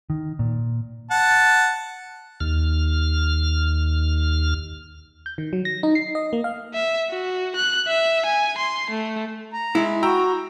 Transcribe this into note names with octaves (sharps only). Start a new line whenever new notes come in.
D#3
A#2
F#5 A5
D#2 F6
G6
D#3
F#3
A#6
D#4
C7
D#5
A#3
F5
E5
F#4
F#6
E5
G#5
C6
A3
A#5
G#3 E4
F#4 G5 A#5 E6